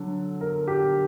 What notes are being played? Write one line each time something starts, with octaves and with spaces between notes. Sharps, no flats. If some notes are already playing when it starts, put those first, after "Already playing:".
Already playing: D3 F#3
A#4
G4